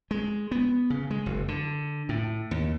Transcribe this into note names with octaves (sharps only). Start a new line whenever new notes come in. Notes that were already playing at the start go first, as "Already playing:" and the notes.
G#3
B3
C#3
G#3
F#1
D3
A2
D#2